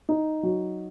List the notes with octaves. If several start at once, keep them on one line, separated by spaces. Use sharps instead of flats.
D#4
F#3